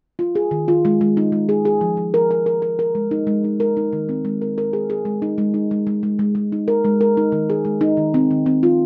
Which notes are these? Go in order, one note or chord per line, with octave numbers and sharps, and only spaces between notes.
F4
G#4
D#3
F4
G#3
G#3
D#4
G#3
G#4
G#4
F3
F3
A#4
A#4
A#4
A#4
A#4
G#3
D#4
G#3
D#4
A#4
D#4
D#3
C4
G#3
A#4
A#4
G#4
G#4
G#3
D#4
G#3
D#4
G#3
G#3
G#3
G#3
G#3
D#4
A#4
G#3
A#4
D#4
D#3
G#4
G#3
D#4
D#3
C4
D#3
C4
F4